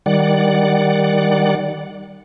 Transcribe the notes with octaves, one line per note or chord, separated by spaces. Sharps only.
D#3 G3 D5 F#5